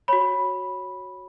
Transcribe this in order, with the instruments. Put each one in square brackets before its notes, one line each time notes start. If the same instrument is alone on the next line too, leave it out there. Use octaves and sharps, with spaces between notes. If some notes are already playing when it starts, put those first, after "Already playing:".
[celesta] F#4 C#5 B5